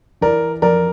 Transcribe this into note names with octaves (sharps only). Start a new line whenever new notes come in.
E3 A#4 D5
F2 A#4 D5